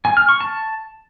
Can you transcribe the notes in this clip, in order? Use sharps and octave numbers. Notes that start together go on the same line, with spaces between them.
G#5
F6
C#6
A5